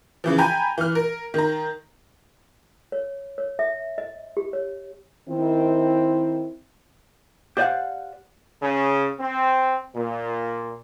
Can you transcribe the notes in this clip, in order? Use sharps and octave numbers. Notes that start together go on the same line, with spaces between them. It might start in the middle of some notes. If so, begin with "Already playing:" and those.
C#3 E3 F3
G5 G#5 A#5 B5
E3 F6
A#4
D#3 A#5
C#5
C#5
E5
D#5
G4
C#5
D#3 C4 E4
G4 C5 D5 D#5 F5 F#5
C#3
C4
A#2